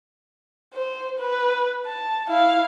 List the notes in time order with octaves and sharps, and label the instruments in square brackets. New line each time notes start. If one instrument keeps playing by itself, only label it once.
[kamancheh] C5
B4
A5
E4 F5